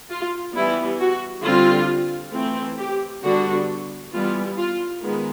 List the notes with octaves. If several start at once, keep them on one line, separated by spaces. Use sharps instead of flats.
F4
E3 G3 B3 E4
F#4
D3 G3 C4 F4
E3 A3 C4
G4
D3 G3 B3 D4 F#4
E3 G3 B3 F4
F4
D#3 G#3 B3